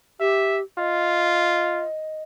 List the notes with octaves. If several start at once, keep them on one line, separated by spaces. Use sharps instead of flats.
G4 E5
F4 D#5